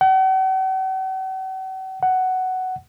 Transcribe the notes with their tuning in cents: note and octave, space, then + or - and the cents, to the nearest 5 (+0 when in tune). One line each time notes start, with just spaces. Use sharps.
F#5 +45
F#5 +10